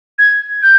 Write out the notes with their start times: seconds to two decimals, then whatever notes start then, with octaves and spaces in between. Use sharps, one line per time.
0.18 G#6
0.62 G6